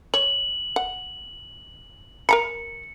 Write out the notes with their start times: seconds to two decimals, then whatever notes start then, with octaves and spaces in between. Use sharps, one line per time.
0.14 C#5 F#7
0.76 F#5
2.29 A#4 A#5 B5 C#7